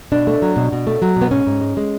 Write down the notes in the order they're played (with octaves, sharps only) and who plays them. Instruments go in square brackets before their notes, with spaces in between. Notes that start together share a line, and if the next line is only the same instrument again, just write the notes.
[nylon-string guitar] B2 D4
A3
F#3
B2
B2
A3
F#3
B2
B3
G#2 C#4
G#2
G#3
G#3